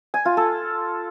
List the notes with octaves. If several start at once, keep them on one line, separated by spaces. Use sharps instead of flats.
G#5
F4
A4